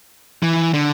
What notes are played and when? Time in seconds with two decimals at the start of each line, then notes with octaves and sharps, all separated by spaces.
0.43 E3
0.74 D3